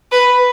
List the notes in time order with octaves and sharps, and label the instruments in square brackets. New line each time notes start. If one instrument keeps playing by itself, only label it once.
[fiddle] B4